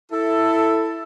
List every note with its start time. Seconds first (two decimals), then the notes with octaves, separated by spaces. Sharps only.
0.12 E4 A4